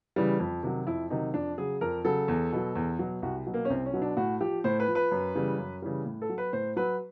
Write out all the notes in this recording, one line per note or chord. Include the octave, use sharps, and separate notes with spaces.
C#3 E3 G3
F2
C3 D#3 F#3
F2 E4
C3 D#3 F#3 D#4
F2 D4
C#3 F#3 G#4
F2 A#4
C#3 F#3 A4
E2
B2 F#3
E2
B2 F#3
C2 F#4
B2 F#3
A#3
C#4
C2 C4
C#4
B2 F#3
D4
A2 F#4
F3 G4
A2 C5
B4
F3
B4
F#2
C#3 E3 G3
F#2
C#3 E3 G3
A2
A4
F#3
B4
A2 C5
F#3 B4